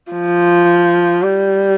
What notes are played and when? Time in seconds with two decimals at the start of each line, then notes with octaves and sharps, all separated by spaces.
0.12 F3
1.23 G3